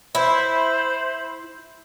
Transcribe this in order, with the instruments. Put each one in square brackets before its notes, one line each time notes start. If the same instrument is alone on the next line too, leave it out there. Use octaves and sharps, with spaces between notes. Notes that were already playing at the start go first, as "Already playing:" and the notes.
[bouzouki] E4 [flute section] C5 B5